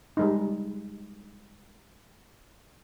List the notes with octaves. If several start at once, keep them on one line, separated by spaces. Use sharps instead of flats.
G3 G#3 D#4